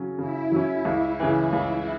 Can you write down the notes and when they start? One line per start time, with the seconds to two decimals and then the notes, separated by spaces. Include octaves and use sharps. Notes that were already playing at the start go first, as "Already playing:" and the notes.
Already playing: C#3 F#3 C#4
0.18 C#3 E4
0.52 F#3 C#4
0.85 C#2
1.20 C#3 E3
1.53 C#2